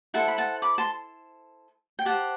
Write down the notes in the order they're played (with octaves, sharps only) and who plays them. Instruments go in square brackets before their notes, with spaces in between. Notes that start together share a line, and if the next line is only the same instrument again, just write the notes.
[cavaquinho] E4 A4 C5 F#5 A5
B5
F#5 A5
B5 D6
A5 C6
G5
G4 C5 F#5 A5